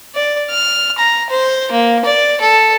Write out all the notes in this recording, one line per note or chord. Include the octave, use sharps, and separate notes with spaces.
D5
F6
A#5
C5
A#3
D5
A4